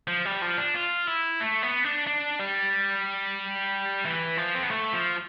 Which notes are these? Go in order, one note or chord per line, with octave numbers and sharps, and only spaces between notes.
F3
G3
F3
D4
F4
E4
A3
B3
D4
D4
G3
E3
F3
C4
B3
A3
F3